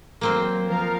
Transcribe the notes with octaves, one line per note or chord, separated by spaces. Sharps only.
F#3 A#3 C4 C5
F3 A#4 F5